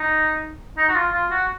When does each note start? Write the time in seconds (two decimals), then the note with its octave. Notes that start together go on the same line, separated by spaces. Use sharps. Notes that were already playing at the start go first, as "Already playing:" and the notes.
Already playing: D#4
0.77 D#4
0.89 F#4
0.95 F4
1.13 F4
1.31 F#4